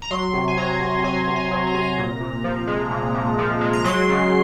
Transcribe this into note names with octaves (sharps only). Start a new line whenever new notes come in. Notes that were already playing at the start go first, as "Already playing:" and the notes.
A#5
F#3 C6
C3
G#5
F#3 A#5
C3
F#3 G#5
C3
G#5
F#3
A#5
C3 G#5
A#5
A#2
A#2
F3
G#3
A#2
A#2
F3
G#3
A#5
F#3 C6
C#3